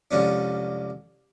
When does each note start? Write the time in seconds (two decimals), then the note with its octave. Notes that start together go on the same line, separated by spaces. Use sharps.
0.11 C2 F2 G#3 C#4 D4